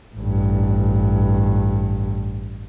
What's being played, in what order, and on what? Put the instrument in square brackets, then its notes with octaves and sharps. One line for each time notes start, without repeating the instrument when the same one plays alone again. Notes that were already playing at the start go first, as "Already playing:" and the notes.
[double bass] A1 G2